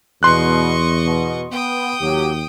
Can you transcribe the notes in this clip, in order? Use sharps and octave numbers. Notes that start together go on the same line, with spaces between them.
E2 B2 D#5 C6 C#6 F#6
B2
B3 G5 D#6
D#2 F#3 G4